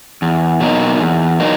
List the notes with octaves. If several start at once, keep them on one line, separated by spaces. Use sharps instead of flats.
E2
B2 F#3 A#3 D#4
E2
F#3 A#3 D#4